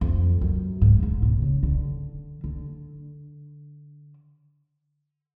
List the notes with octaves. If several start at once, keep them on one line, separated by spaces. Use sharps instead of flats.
F2
F#2
G#2
G#2
B2
C#3
D3
D3